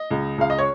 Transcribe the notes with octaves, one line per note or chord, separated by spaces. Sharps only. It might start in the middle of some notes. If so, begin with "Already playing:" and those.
Already playing: D#5
C#2
C#2 F5
D#5
C#5